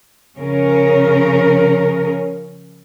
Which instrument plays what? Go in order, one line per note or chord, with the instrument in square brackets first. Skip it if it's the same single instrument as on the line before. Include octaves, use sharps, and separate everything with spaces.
[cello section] C#3 F3 C#4 A#4